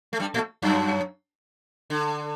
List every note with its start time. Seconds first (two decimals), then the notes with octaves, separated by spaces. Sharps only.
0.13 A3
0.20 G2 G3
0.34 A2 A3
0.62 F#2 F#3
1.90 D3